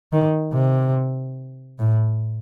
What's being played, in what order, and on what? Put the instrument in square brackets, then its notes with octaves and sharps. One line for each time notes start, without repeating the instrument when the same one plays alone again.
[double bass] D#3
C3
A2